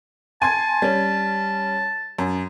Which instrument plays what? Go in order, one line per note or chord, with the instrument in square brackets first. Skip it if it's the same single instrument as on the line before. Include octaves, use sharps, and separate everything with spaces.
[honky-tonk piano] G#5 C6 G#6 [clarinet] A5
[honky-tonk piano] G3 C#4
F#2